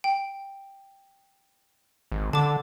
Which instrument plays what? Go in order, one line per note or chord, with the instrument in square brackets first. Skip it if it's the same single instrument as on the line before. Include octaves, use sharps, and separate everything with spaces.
[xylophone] G5
[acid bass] G#1
[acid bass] D3 [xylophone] A5 D6